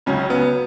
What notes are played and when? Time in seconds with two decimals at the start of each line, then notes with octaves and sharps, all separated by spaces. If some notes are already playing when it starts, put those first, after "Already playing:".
0.06 C#2 C#3 F#3 C#4
0.30 B3